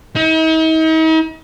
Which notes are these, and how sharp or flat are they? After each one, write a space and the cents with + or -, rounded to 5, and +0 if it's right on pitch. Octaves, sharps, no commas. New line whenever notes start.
D#4 +45